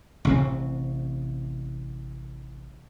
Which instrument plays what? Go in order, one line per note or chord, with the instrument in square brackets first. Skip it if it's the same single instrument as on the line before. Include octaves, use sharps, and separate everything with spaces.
[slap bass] A1 C3 C4